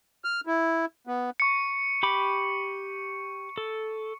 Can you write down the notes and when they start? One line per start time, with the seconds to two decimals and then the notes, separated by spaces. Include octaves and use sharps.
0.24 F6
0.47 E4
1.07 B3
1.40 C#6 C#7
2.03 G4 B5 D6
3.58 A4